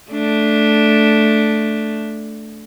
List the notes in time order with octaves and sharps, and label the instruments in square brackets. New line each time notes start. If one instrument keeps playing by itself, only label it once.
[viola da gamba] A3 D4